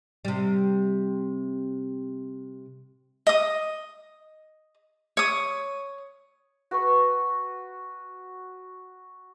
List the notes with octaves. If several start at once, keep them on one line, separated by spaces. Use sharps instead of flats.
C3 G3
D#5 D#6
C#5 D#6
F#4 B4 B5 C#6